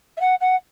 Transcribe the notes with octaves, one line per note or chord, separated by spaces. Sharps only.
E5
F#5
F#5